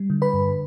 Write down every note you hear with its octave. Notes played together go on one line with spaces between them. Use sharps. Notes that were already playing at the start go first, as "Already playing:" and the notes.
Already playing: G3
D3
B4 B5
G2